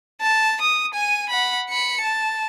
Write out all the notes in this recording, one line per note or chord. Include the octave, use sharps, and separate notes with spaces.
A5
D#6
G#5 D#7
F#5 B5
B5 C#7
A5